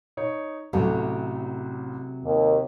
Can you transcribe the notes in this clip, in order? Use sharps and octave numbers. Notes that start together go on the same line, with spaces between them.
D#4 C#5
A1 C3 F#3 A3
D#2